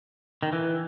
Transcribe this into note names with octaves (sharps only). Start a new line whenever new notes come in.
D#3
E3